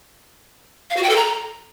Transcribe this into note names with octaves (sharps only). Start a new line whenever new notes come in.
F5
F#4
G5
A4
A#5